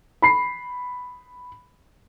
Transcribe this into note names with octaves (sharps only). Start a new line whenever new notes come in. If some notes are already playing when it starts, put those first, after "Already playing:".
B5 C7